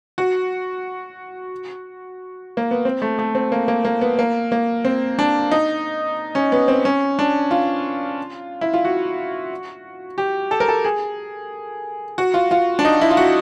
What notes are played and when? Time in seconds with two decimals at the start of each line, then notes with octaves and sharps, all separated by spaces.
0.18 F#4
2.57 A#3
2.71 B3
2.85 C4
3.02 A3
3.19 A3
3.35 C4
3.52 A#3
3.68 A#3
3.85 A#3
4.01 B3
4.19 A#3
4.52 A#3
4.85 C4
5.19 D4
5.51 D#4
6.35 C#4
6.52 B3
6.68 C4
6.85 C#4
7.19 D4
7.51 F4
8.61 E4
8.74 F4
8.85 F#4
10.18 G4
10.51 A4
10.60 A#4
10.68 A4
10.84 G#4
12.18 F#4
12.34 F4
12.51 F4
12.79 D4
12.85 D#4
13.01 E4
13.11 F4
13.17 F#4